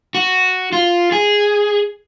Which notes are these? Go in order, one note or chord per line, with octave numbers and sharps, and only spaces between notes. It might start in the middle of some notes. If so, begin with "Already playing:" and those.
F#4
F4
G#4